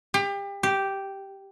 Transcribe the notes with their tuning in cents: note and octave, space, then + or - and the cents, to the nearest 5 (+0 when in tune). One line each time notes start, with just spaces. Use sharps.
G4 +30
G4 -5